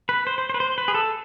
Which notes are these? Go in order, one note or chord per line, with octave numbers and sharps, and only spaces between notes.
B4
C5
C5
C5
B4
C5
B4
G#4
A4